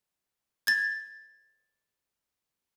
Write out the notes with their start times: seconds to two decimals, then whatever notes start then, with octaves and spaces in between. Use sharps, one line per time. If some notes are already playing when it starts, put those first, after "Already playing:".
0.67 G#6 A6